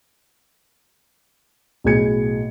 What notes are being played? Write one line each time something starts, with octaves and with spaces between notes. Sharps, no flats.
B1 A2 G#4 G#6 C#7